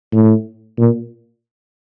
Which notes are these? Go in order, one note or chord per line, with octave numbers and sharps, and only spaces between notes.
A2
A#2